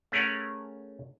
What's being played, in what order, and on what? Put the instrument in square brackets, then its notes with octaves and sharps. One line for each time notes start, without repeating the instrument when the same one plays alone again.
[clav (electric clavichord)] A3 C#4 G#4 A#4 C#5 F#5